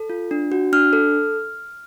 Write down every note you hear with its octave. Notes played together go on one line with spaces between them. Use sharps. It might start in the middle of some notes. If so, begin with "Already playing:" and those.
Already playing: A4
F4
D4
F#4
D4 F6
A4